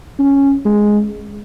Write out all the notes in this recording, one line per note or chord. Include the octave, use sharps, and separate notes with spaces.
C#4
G#3